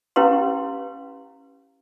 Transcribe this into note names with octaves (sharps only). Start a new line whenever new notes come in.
C#4 E4 G4 B4 F5 C6